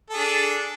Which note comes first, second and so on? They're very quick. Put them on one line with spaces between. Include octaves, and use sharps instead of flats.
A4 G#4 D4